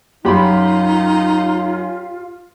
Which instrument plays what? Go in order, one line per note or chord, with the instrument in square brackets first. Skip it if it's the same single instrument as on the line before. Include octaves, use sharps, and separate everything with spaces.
[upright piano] F#2 [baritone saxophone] D#4 [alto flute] F4 [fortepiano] G4 B5 C6